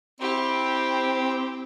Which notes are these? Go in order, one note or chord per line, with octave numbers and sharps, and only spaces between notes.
C4 E4 G4